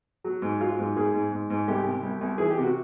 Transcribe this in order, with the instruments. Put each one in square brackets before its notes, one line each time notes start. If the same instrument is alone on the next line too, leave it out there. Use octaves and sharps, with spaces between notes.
[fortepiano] F#3
G#2
F#3 F4
G#2
G#2 G#4
G#2
G#2
G#2
C2 G4
C3
C2
C2
E3 G#4
G4
C3
F#4